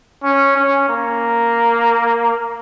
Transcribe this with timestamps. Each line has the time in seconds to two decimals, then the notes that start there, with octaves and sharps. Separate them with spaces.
0.24 C#4
0.56 C#4
0.89 A#3